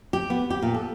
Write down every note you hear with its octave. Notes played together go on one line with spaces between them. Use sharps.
G4
B3
G4
A#2
A4